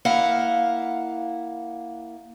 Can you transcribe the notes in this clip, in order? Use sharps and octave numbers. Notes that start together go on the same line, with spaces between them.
A#3 E4 F5 F#5